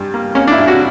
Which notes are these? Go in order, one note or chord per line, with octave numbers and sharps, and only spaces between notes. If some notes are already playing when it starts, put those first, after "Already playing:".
Already playing: G2 G3
A#3
A#3 C#4
D4
E4
G2
F#4